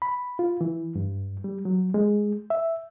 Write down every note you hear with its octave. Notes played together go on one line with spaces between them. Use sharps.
B5
F4
E3
G2
G3
F#3
G#3
E5